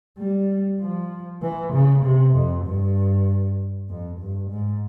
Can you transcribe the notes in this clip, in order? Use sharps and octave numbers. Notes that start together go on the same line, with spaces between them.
G3
F3
E3
C#3
C3
F2
G2
F2
G2
G#2